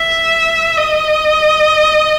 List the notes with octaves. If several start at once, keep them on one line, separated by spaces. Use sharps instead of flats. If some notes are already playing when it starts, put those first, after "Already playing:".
Already playing: E5
D#5